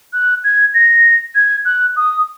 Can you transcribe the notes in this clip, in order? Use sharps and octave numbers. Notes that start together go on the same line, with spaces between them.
F#6
G#6
A#6
G#6
F#6
D#6